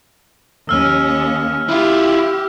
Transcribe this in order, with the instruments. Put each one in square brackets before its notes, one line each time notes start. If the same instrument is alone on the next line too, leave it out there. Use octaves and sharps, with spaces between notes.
[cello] D#2 C#4 [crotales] E6 F6
[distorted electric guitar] E4 F4 [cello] G4